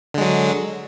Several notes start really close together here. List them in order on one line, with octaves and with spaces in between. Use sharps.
D3 G#3 F#3